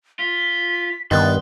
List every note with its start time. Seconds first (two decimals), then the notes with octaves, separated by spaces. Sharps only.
0.19 F4 B6
1.11 G2 D#3 B3 B4 C6 A6